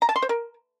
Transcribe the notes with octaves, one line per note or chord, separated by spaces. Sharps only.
A#5
A5
C6
C5
A#4